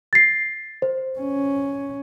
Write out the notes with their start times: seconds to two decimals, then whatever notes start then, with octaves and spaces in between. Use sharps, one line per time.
0.13 A6 C7
0.82 C5
1.19 C#4